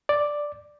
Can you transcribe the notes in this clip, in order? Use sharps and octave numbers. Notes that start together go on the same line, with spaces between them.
D5